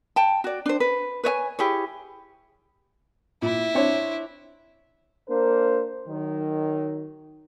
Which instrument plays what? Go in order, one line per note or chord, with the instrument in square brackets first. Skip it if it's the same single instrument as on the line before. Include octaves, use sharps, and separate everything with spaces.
[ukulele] G5 A5
F#4 D5
D4 C5
B4
B4 C#5 D#5 G#5
E4 G4 G#4 C#5
[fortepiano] A#2 [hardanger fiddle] E4
[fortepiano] C4 D4 C#5
[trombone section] A#3 D4 A#4 C5
D#3 F#3